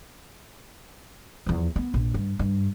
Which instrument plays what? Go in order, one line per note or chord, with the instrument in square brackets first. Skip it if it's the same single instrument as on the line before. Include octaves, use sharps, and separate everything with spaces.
[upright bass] E2 F3
B3
A#1
G2
G2